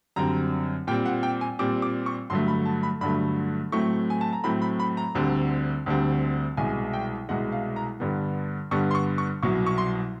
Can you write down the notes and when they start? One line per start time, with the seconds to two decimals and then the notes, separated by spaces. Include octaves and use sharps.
0.16 F#2 D3 G3 C4 A#5
0.87 A#2 G3 C4 G5
1.05 F#5
1.23 G5
1.41 G#5
1.59 A#2 G3 C4 D6
1.82 D6
2.06 C#6
2.30 G2 D3 F#3 A3 C6
2.48 B5
2.66 A5
2.83 B5
3.01 G2 D3 F#3 A3 B5
3.72 A2 F#3 A3 C4 C#6
4.10 G#5
4.21 A5
4.33 A#5
4.44 A2 F#3 A3 C4 B5
4.62 B5
4.80 B5
4.97 A#5
5.15 D2 D3 G3 C4
5.86 D2 D3 G3 C4
6.57 C2 B2 G#3 G#5
6.93 G5
7.29 C2 B2 G#3 F#5
7.52 F5
7.76 A#5
8.00 G2 D3 G3 B3
8.71 G2 D3 G3 B3 C#6
8.91 C6
8.95 C#6
9.18 C#6
9.43 C2 B2 F#3 C#6
9.66 C#6
9.78 C6